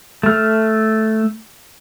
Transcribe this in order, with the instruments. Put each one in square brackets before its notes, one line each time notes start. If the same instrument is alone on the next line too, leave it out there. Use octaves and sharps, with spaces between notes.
[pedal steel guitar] A3 F6